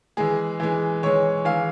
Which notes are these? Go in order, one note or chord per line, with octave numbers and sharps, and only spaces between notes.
E3 G#3 G#4
E3 G#3
E3 G#3 C#5
E3 G#3 F5